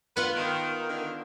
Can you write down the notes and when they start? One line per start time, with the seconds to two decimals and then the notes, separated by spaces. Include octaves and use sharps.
0.17 B3 F4 B4 F#5
0.36 D#3
0.89 D3 D#3